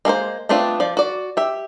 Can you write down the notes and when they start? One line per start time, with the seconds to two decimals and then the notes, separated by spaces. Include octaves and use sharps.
0.05 G#3 A#3 A#4 C5
0.49 A3 B3 C4 D4 F4
0.80 F3 D5
0.97 F#4 D5
1.37 G4 E5